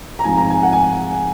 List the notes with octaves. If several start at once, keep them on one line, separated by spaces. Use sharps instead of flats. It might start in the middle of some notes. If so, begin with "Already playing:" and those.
A#5
G#2 F3 C4 G#5
A#5
G#5
F#5
G#5